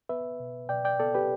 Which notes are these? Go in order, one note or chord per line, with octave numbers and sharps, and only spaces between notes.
B3 B4 E5
B2
B2 D5 G5
D5 G5
B3 A4 D5
G4 B4